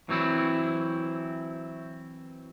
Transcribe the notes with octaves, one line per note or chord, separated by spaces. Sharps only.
E3 F#3 C4 E4